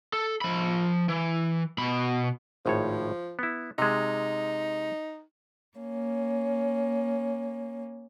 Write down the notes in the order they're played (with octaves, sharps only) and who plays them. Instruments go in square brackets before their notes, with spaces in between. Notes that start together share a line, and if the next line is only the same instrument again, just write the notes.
[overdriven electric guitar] A4
F3 B5
E3
B2 B5
[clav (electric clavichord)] G#1 A2 C#5 [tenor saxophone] F3
[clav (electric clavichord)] B3 E4
[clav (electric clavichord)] C3 G#3 [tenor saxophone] D#4
[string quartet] A#3 C#4